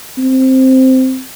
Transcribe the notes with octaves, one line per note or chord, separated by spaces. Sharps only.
C4